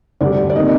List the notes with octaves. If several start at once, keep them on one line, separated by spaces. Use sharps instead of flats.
D2 D3 G3 D5
D5
C3 D#3 A#3 D#4 D#5